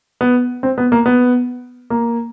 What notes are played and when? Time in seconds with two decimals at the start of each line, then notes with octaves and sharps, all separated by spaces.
0.21 B3
0.63 C4
0.78 B3
0.92 A#3
1.06 B3
1.90 A#3